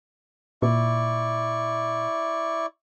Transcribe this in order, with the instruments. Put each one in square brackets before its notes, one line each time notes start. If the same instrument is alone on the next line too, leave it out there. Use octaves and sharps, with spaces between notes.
[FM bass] A#2 [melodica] E4 D5 C#6